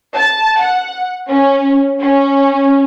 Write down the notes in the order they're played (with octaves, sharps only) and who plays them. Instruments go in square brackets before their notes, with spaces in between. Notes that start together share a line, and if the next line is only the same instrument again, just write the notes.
[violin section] A5
F#5
C#4
C#4